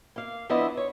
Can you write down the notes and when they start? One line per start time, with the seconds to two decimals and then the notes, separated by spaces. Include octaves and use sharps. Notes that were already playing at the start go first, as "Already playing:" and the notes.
0.16 A#3 F5
0.49 F3 B3 D4 E4 D#5 E5
0.77 C#5